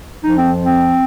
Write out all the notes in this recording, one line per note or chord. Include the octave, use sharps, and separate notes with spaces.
F2 F3 D#4
C4
C4